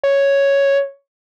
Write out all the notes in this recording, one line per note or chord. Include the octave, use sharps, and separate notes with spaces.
C#5